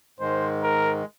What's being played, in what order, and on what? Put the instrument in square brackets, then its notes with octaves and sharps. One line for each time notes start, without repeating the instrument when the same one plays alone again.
[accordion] G#2 D#3 G#3 [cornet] C5
[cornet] A#4